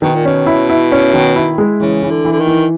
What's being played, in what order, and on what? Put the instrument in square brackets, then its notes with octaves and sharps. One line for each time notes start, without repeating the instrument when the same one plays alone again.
[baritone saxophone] B2 [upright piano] D#3
[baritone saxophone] A#2
[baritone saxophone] B2 [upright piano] C#4
[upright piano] E4
E4
C#4
D#3
E4
G#3
[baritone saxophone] C#3 [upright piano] E3
[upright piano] E3
[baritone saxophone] D3
[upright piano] E3
[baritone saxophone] D3
D#3
[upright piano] E3